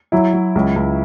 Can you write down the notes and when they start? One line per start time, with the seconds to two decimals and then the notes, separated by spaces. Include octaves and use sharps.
0.12 F#3 E4
0.33 F#3
0.55 C#2
0.76 C#2